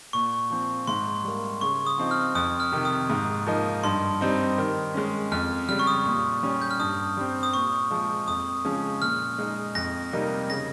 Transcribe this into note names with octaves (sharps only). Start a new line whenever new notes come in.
A#2 C#6
F3 C4
G#2 C6
G3 A#3
C#3 C#6
D#6
F3 C4 D#4
F6
F2 D#6
F6
C3 D#3
D#6
G#2
F3 A#3 D#4
G2 C6
G3 C4 D#4
D#3
G#3 C#4
F2 F6
C#3 G3 F6
C#6
D#6
A#2
G3 C#4
G6
F6
G2 D#6
G3 C4
D#6
A#2 C#6
F3 G#3
F2 D#6
C#3 F3 G#3 C#4
A#2 F6
G#3 D#4
F2 A#6
C3 G3 A#3 D#4
C#3 A#6